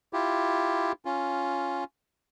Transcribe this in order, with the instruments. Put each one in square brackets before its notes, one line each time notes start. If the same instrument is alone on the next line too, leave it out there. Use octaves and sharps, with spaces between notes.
[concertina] E4 F4 G4
C#4 F4